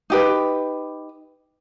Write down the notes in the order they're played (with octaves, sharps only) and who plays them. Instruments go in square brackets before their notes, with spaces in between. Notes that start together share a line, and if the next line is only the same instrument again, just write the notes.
[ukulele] D#4 G4 B4